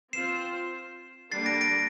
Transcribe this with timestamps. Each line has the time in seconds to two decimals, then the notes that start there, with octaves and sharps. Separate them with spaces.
0.13 C4 F4 C5 C7 E7
1.31 D3 G3 A#3 D4 A6 C7
1.46 A#6 D7
1.61 A#6 D7